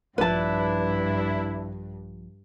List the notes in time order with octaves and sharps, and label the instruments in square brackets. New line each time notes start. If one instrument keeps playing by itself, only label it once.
[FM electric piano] A#1 F3 [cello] G2 [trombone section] D4 E4 [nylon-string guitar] B4 A5